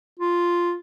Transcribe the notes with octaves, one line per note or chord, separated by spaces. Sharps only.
F4